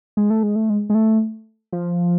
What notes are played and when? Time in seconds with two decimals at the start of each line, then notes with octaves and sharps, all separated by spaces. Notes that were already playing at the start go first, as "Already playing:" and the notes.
0.17 G#3
0.30 A3
0.43 G#3
0.56 A3
0.70 G#3
0.90 G#3
0.95 A3
1.73 F3